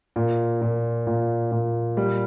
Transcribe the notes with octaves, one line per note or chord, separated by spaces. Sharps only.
A#2
A#2
A#2
A#2
G3